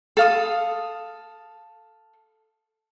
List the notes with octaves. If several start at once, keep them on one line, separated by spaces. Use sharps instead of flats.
A4 F5 D#6